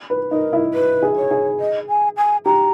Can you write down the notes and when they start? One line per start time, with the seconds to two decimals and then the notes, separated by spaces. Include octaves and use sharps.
0.10 B4
0.31 D#4 A#4
0.53 E4
0.74 B4
1.03 G#4
1.17 C#5
1.31 G#4
1.60 D#5
1.89 G#5
2.17 G#5
2.45 G4 A#5